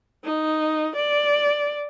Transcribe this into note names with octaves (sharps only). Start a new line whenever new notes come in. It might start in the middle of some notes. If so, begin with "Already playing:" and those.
D#4
D5